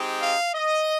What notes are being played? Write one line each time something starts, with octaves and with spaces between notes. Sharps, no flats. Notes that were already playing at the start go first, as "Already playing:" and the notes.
Already playing: G#3 C4 D#4 G4
F5
D#5